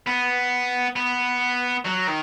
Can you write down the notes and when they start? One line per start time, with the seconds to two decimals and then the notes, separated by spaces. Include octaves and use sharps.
0.07 B3
0.96 B3
1.85 F#3
2.07 D#3